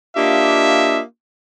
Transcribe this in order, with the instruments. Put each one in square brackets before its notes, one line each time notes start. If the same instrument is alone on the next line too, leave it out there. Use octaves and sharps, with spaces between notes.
[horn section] A#3 D4 F4 G4 D#5 E5